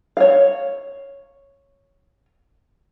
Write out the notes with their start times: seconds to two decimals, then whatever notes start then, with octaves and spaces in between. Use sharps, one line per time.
0.17 C#5 F5